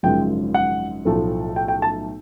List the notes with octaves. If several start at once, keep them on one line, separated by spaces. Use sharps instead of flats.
G#1 F#2 C#3 F3 G#3 G5
F#5
B1 A2 F3 A3
G5
G5
A5